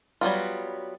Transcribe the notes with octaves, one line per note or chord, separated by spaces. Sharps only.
F#3 G3 B3 F4